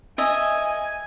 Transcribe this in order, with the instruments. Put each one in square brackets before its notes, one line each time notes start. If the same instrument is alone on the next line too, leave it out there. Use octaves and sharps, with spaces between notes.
[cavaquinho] D#5 E5 [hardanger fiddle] G#5